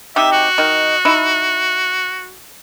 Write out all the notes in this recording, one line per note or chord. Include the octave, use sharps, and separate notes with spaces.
C3 D#4 G4 E5
F#4
D#3 D#4
D#4 E4